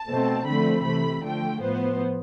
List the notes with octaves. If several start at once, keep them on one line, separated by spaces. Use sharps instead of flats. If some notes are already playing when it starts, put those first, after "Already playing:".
Already playing: A5
B2 A3 C4
D3 F3 A3 C4 B5
C3 E3 A3 B5
D3 F3 A3 G5
A2 F3 B3 C5